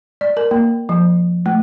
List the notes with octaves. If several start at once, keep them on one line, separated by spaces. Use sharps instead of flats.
D5
A#4
A#3
F3
A3